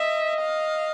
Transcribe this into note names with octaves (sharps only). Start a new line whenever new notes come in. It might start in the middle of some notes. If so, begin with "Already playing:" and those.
Already playing: D#5 E5
F5